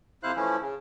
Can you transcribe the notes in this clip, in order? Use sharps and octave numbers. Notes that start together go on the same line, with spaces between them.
F2 C3 E4 C5 F5 F#6
E3 F3 A3 C#4 E4
C#3